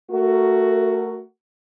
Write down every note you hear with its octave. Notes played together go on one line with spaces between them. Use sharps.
A3 F#4 A#4